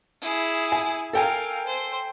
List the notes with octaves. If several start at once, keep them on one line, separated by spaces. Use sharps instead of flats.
E4 G#4
G#5
A4 A#4 F5 G5 G#5
C5